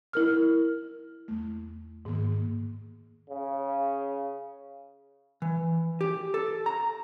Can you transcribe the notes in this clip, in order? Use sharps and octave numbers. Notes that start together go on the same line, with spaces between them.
E4 A#4 F6
E2 A3
G#2 D#3 A#3
C#3
E3
G4
A4
A#5